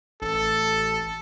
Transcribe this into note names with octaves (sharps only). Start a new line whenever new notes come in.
A1 A4